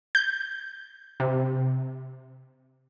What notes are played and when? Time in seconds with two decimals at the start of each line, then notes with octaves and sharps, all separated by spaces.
0.15 G6
1.20 C3